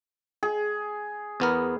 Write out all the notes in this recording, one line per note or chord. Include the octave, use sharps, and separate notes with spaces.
G#4
E2 B3 A#4